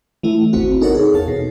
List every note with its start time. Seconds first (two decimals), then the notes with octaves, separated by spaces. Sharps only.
0.23 E3 A3 E4
0.53 G#1 D#2 C3 C4 F#4
0.81 B3 D#4 A4 A#4 C#5 F#5
0.95 G#4
1.13 E2 C#5 F5 A5
1.28 B2